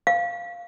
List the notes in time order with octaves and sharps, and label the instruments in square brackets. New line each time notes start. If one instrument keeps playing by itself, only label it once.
[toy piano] F5